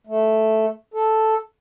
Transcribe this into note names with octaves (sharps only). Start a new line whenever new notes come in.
A3
A4